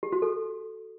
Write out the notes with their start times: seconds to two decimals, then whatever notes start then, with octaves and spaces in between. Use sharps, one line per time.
0.03 G4
0.12 F#4
0.22 A4